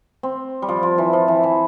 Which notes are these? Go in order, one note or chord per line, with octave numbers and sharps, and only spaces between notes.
C4
G3
F3
F3
E3
F3
E3
E3